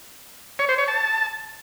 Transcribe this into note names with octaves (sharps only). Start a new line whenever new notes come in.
C#5
C5
C#5
A5